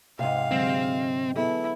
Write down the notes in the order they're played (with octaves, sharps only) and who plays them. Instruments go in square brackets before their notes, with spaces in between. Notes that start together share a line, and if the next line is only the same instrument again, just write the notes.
[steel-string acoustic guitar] G#2 C3 [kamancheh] F5
[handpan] D3 F#3 G#3 [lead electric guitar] C4
[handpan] B3 G#4 A4 [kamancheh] E4